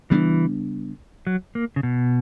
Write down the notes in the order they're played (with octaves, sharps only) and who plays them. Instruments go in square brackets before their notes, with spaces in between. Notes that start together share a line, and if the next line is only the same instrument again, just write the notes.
[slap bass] C#3 G3 B3 D4 [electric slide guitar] E3
[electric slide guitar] F#3
A#3
C#3
B2